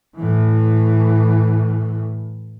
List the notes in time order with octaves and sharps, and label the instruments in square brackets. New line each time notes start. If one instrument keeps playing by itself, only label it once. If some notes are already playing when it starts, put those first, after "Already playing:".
[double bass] A2 E3